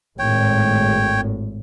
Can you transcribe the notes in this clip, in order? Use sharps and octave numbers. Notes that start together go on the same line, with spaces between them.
G#1 A2 C#5 G5